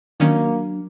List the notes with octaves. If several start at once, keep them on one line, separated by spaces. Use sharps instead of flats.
D#3 F#3 A#3 C#4 D4